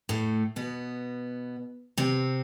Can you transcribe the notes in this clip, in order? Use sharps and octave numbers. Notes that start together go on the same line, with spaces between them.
A2 A3
B2 B3
C3 C4